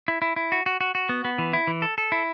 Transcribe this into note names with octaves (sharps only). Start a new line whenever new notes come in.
E4
E4
E4
F#4
F#4
F#4
F#4
B3
B3
E3
E4
E3
A4
A4
E4